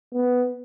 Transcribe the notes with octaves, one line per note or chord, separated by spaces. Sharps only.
B3